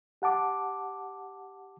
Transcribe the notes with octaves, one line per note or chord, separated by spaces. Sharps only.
G4 F#5 A5 D6